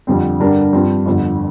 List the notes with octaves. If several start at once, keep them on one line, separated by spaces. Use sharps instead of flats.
F2 D3 G3 C4
G2 D3 G3 D4 A#4
G2 F3 C4
G1 F2 D3